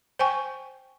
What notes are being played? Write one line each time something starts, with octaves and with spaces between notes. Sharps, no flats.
C5 G5 G#5 C#6